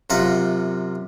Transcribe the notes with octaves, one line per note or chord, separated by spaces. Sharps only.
F#2 C3 F4 F#5 A#5